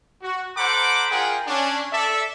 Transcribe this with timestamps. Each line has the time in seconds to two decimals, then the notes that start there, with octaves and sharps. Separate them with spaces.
0.22 F#4
0.57 A4 C5 F#5 A#5 B5 D6
1.10 D4 F4 G#4 A#4 F#5 G5
1.47 C#4 D4
1.92 A4 D5 E5